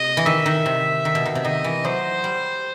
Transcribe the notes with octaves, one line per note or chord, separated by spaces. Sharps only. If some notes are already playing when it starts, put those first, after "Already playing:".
Already playing: C3 D#5
E3
D#3 E5
D#3
C3
D#3
B2
D#3
C3
D#3 D#5
E3
F#3 C5
G3